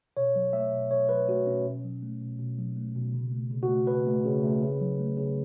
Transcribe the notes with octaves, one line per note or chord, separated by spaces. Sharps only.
B2 C#5
F#3
A3 E5
B2
B2 C#5
F#3 B4
A3 F#4
B2 C#4
B2
F#3
A3
B2
B2
F#3
A3
B2
C#3
A3
C#3
F#4
A3
C#3 B4
A3
C#3
A3
C#3
F#3
A3
C#3